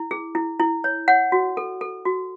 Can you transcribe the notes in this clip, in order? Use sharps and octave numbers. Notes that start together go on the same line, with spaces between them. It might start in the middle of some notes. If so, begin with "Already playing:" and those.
Already playing: E4
G#4
E4
E4
C#5
C#5 F#5
F#4
A4
A4
F#4